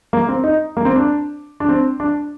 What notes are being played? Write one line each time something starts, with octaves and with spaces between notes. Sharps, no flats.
A#3
C4
D#4
A#3
C4
D4
D4
C4
D4